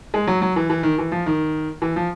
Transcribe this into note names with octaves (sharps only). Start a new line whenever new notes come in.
G#3
F#3
F#3
E3
E3
D#3
E3
F3
D#3
E3
F3